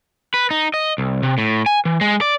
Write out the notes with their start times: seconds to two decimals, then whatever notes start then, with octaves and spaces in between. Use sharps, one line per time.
0.34 B4
0.51 D#4
0.74 D#5
0.98 C2
1.23 C3
1.38 A2
1.66 G#5
1.85 E3
2.01 G#3
2.21 D5